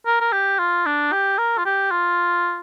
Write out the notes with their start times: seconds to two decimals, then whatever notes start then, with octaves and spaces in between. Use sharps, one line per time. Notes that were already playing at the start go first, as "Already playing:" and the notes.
0.06 A#4
0.21 A#4
0.32 G4
0.59 F4
0.86 D4
1.12 G4
1.38 A#4
1.58 F4
1.65 G4
1.91 F4